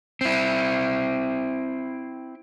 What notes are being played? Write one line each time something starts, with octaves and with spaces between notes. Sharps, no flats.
C4 E4